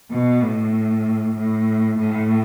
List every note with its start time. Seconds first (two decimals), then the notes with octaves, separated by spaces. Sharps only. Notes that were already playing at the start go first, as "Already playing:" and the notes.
0.11 B2
0.42 A2
1.36 A2
1.99 A2